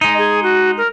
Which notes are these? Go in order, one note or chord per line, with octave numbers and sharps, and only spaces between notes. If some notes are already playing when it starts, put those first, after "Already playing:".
G#3 D#4 D#5
G#4
F#4
A#4